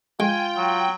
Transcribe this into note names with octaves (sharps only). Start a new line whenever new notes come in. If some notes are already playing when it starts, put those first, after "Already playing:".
G#3 F4 G5 G#5
F#3